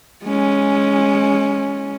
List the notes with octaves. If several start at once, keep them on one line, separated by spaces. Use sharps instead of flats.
G#3 C#4